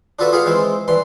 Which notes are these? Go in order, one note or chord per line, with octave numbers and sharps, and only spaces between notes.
D4 F4 F#4 A4 B4 E5
F4 G#4 B4 F5 F#5
E3 G#3 C4 C5
G2 E3 C6